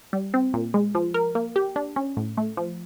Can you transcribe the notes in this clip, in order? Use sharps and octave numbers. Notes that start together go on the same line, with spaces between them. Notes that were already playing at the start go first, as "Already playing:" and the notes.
G3
C4
A#2
G#3
F3
A#4
A#3
G4
D4
C#4
A2
A3
F3